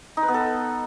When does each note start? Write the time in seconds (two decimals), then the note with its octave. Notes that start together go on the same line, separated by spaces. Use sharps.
0.17 D#4
0.23 B4
0.28 B3
0.34 A4